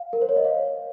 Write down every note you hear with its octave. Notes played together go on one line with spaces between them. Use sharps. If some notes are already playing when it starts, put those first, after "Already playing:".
Already playing: F5
A#4
C5
C#5
D#5
F5